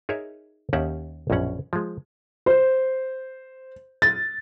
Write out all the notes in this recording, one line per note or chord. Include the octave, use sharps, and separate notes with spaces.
D#4 G#4 A#4 C#5 E5
D#2 C#4 D#4 G4 E5 F#5
A#1 F#2 B2 C#4 F#5
F3 G#3
C5
A6